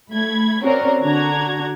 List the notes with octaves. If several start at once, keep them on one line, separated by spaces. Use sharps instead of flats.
A3 B5 G#6
C4 C#4 F#4 A#4 C#5 D5
D3 D4 F#4 A#5 G#6